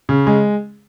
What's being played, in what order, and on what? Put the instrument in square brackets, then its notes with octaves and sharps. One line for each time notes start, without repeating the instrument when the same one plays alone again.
[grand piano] C#3
G#3